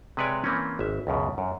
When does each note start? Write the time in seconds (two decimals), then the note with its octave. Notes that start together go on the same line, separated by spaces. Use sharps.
0.17 C3 G#3 B4 C#5 D5 G#5
0.44 E3 A#3 C4 C#4
0.79 G#1 E5
1.07 C#2 F#2 B2
1.38 F#2